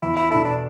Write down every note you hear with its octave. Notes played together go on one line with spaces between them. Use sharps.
E2 E4
E4
B2 B3 D4 E4 A4
D4